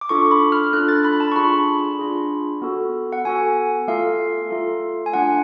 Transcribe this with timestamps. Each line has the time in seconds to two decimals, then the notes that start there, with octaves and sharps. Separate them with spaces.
0.01 D6
0.09 D4 F4 A4 C#6
0.31 B5
0.52 F6
0.73 D4 F4 A4 F#6
0.89 A6
1.04 B5
1.20 A5
1.32 C#6
1.36 D4 F4 G#4 B5
1.99 D4 F4 G#4
2.62 B3 F#4 A4
3.13 F#5
3.25 B3 F#4 A4 G#5
3.88 A3 F4 A4 F5
4.50 A3 F4 A4
5.06 G#5
5.13 A3 D4 F4 F#5